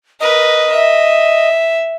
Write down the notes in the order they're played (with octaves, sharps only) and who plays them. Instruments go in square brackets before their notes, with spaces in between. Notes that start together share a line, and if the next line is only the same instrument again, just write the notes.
[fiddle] A#4 B4 [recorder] D#5
[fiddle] E5